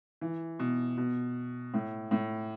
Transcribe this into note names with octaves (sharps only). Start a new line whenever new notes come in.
E3
B2
B2
A2
A2